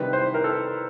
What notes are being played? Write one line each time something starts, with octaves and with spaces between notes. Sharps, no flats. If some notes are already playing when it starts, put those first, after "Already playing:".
Already playing: C3 D#3 G3 B4
C5
A#4
A4